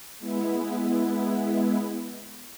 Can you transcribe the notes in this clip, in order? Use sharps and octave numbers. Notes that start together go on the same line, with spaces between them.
G#3 B3 E4